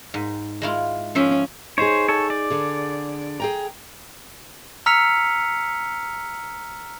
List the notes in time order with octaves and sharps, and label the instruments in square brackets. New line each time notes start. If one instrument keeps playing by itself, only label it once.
[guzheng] G#2
G#3 E4 F4
[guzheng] F3 E5 C6 [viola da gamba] C#4
[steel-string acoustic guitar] D#4 G#4 [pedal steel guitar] C5 C#5
[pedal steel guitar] A4 C#5
D5
[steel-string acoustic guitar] D3 G#4
G#4 G5 A#5
[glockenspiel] A#5 E6 F6 B6 C#7 F7